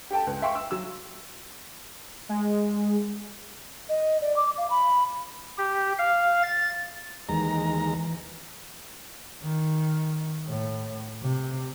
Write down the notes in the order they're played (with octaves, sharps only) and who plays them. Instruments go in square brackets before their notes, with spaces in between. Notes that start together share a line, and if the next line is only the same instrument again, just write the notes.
[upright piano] G4 A4 G5 A5
C#2
E5 F5 G5 C6 C#6
E6
F#3 E6
[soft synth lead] G#3
[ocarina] D#5
D5
D6
F5
B5
[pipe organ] G4
F5
A6
[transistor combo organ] D#2 G#3 A#5 [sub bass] E3
[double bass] D#3
A2
C3